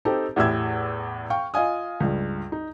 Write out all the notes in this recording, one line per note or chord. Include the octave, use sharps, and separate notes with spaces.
C4 D#4 G4 A4
E2 A2 G4 E5 E6 G#6
F5 G5 C#6
F4 D#5 F5 G#5 D#6
C#2 G2
D#4